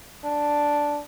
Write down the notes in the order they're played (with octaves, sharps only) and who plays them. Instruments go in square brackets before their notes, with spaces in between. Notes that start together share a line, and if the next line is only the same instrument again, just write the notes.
[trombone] D4